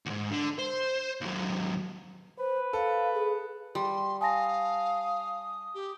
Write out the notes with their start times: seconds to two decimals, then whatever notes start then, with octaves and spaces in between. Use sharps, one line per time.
0.06 D2 G#2
0.31 D3
0.59 C5
1.21 D#2 F#3
2.39 B4 C5
2.73 A4 F5
3.14 G#4
3.75 G3 C6
4.21 F5 G#5 A5 D#6 A#6
5.74 G4